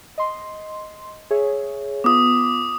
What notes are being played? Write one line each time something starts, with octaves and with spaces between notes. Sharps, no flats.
D#5 C6
G#4 C#5 E5
B3 F4 D6 D#6